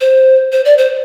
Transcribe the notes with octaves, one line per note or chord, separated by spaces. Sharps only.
C5
C5
D5
C5